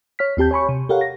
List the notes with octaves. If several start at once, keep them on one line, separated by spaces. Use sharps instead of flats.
C#5 F6 B6
D#2 C4 G4 A5 G6
C#5 G#5 B5 C#6
C3
G4 A4 A#4 C#5 F5 F#5
A#6